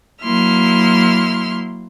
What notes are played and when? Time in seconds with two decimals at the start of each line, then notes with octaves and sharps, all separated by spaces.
0.24 F#3 A#3 E4 C6 F6